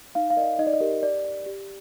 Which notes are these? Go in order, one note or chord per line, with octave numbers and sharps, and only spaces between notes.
D#4 F5
F5
A#4 D5 D#5
D#4 D#5
D5
D#5
G4 A#4 D5
G4 D5
D5
G4